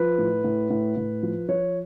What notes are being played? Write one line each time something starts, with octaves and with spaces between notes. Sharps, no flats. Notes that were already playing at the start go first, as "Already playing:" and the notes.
Already playing: F3 B4
A2
A2
A2
A2
F3
F3 C#5